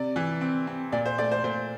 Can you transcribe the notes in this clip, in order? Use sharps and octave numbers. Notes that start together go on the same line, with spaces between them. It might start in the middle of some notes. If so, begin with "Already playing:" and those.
Already playing: C3 D5
E3
C4
C4
A#2 D5
C5
A3 D5
C5
A#2 C5